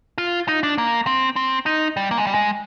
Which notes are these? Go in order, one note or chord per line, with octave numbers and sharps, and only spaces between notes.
F4
D#4
D4
A#3
C4
C4
D#4
G3
A#3
G#3
G3
G#3